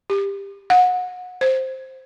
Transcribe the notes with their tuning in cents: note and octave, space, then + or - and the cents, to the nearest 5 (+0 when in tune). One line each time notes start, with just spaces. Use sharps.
G4 +20
F#5 -30
C5 +5